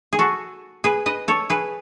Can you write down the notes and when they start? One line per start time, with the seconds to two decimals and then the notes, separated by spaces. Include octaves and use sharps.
0.13 G#4
0.19 F#4 A4
0.84 G#4 B4
1.06 B4 D#5
1.28 A4 C#5
1.50 G#4 B4